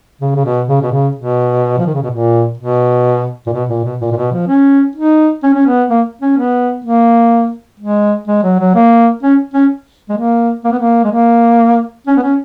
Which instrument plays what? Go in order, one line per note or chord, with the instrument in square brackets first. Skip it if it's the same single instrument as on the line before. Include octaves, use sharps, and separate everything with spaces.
[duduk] C#3
C#3
B2
C#3
B2
C#3
B2
F3
D#3
C#3
B2
A#2
B2
A#2
B2
A#2
B2
A#2
A#2
B2
F3
C#4
D#4
C#4
C#4
B3
A#3
C#4
B3
A#3
G#3
G#3
F#3
F#3
A#3
C#4
C#4
G#3
A#3
A#3
B3
A#3
G#3
A#3
C#4
B3
C#4